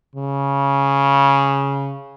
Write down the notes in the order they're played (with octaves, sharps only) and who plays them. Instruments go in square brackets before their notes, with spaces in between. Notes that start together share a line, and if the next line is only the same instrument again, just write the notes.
[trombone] C#3